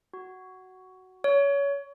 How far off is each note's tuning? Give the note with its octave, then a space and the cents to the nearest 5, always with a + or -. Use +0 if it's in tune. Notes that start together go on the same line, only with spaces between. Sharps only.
F#4 +10
C#5 +25